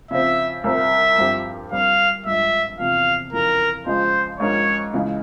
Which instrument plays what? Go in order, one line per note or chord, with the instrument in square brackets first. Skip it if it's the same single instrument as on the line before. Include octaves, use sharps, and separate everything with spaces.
[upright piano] C#3 F3 C4 [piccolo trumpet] E5
[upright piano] C2 A#2 G3 C4 [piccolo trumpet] E5
[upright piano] G2 F3 C4 G4
[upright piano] A#2 G3 C4 [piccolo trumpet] F5
[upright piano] G2 F3 G#3 [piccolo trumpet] E5
[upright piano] E2 C3 F3 [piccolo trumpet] F5
[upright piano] F2 C#3 E3 [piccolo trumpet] A#4
[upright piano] C#2 C#3 F3 G#3 [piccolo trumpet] C5
[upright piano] G#2 F3 A#3 C#4 [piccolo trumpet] C#5
[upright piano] C#2 C#3 E3 G#3